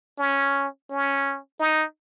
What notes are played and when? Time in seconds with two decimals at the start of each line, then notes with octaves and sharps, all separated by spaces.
0.19 C#4
0.90 C#4
1.60 D#4